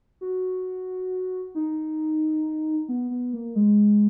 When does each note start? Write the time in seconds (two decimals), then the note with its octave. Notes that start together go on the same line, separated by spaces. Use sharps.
0.21 F#4
1.55 D#4
2.88 B3
3.10 B3
3.33 A#3
3.55 G#3